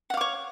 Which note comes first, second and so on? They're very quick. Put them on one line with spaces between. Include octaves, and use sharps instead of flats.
F#5 F5 D6 C#5